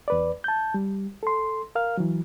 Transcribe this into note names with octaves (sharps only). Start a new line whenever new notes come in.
E2 B4 D5
A5 G6
G3
A4 C6
A#4 F5 F6
E3 F#3